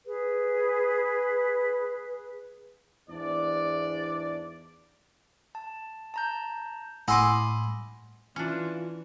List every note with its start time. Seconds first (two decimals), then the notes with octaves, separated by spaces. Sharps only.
0.06 G#4 B4
3.09 E2 G#2 D4 D5
5.55 A5
6.14 A5 A#5 G6
7.08 A2 D#5 F#5 G#5 B5 C6 D6 E6
8.36 E3 C#4 D4 F4